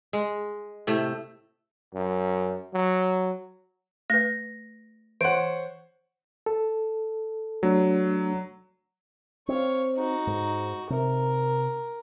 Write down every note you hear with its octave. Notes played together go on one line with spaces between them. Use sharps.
G#3
A2 C3 A3
F#2
F#3
A3 B4 A#6
E3 C5 C#5 F#5 D7
A4
F#3 A3 D4
C4 C#5 F5
D#4 F#4
G#2
C3 A#4